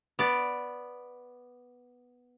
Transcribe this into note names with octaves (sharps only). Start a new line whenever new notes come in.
B3 D5